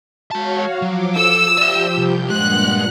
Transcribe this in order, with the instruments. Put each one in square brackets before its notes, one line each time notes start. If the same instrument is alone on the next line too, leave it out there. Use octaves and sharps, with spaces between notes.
[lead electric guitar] G#3 A5 [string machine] F#4 C#5 F5
[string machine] F3 D6 [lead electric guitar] F#3
[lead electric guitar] A4 [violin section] E6
[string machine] F3 G4 G6 [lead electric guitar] D5 E5
[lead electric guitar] C2
[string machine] G2 A#2 F#5 [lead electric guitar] G#3 [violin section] F#6